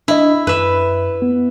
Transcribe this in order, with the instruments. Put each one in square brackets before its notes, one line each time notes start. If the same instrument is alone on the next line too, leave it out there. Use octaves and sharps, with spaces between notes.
[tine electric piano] D4 D#5 [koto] E4
[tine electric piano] F#2 [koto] B4 E5
[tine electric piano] B3